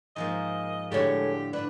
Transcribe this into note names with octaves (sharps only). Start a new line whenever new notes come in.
G#2 F3 A#3 D#5
A2 D3 G#3 G4 A4 C#5
D4 B4